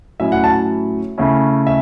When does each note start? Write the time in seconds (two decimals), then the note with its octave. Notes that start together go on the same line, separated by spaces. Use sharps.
0.20 A2 F#3 C#4 E4 E5
0.32 F#5
0.44 A5
1.18 C#3 A3 C#4 E4
1.67 E5